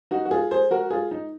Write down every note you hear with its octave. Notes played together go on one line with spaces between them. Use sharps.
D#4 F#4
F#4
F4 G#4
G#4 C5
F#4 A#4
F4 G#4
D#4